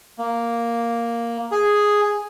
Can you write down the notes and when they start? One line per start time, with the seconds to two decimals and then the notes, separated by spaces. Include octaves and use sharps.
0.18 A#3
1.51 G#4